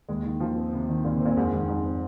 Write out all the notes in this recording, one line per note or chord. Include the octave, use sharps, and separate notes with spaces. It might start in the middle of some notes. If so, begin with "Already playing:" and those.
D#2 G#3
D#3
D#2 F3
C4
D#2 C3
D#3
D#2 A#2
C3
A#2 C4
F2 G#2
G#2 D#3
F2 G#2
C4